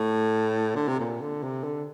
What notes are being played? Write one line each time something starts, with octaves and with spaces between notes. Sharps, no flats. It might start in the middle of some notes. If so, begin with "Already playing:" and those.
Already playing: A2
D3
C3
A#2
D3
C3
D3